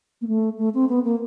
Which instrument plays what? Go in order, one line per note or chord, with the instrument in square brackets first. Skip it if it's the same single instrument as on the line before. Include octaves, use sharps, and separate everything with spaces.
[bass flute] A#3
A3
A3
C4
B3
A#3